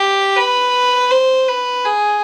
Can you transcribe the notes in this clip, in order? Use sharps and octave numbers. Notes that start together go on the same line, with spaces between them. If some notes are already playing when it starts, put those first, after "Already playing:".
Already playing: G4
B4
C5
B4
G#4